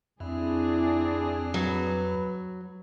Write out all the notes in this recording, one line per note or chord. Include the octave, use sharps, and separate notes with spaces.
F2 C4 D4 E4 G#4
F#3 B4